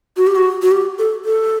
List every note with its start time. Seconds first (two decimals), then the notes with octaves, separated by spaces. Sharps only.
0.17 F#4
0.27 G4
0.36 F#4
0.62 F#4
0.71 G4
0.99 A4
1.25 A4